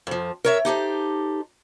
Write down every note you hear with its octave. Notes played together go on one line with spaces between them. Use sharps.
F2 F3
A#4 C#5 E5
D#4 G4 A4 C5